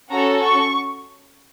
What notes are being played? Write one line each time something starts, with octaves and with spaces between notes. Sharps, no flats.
C#4 F#4 A4 A#5
C#6